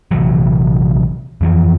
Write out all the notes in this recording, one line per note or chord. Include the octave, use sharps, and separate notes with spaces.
A#1 C3 E3 F#3
F2 E3 F3